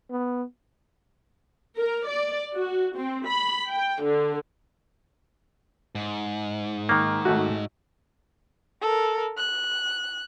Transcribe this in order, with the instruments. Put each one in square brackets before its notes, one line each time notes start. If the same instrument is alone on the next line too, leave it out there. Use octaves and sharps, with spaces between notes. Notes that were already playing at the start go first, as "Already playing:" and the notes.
[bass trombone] B3
[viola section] A#4
D5
F#4
C4
B5
G5
D3
[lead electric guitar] G#2
[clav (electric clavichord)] D#3 A#3
[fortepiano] G#1 A3 F#4
[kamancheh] A4 A#4
F#6